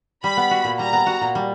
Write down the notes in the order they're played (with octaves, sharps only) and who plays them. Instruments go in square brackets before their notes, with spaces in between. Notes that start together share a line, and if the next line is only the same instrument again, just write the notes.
[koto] G3 [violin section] B5
[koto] B3
F#4
A#2
[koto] G3 [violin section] A#5
[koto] B3
F#4
A#2
G3